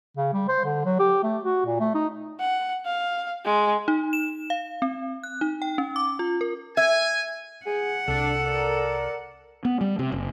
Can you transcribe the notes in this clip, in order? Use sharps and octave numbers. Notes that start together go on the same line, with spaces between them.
C#3
G3
C5
D3
F#3
G4
A3
F#4
A#2
A3
D#4
F#5
F5
G#3
D#4
E7
F5
C4
F#6
D#4
G5
C#4
D6
F4
A#4
E5 G#5
G#4 F#5
C2 D4 A4
A#4 D5
B3
G3
C3
F#1